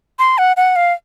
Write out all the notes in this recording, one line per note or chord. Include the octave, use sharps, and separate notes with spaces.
C6
F#5
F#5
F5